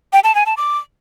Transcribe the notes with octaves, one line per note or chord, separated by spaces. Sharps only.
G5
A5
G#5
A5
D6